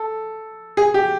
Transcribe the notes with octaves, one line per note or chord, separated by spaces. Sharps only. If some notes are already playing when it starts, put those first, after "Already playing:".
Already playing: A4
G#4
G4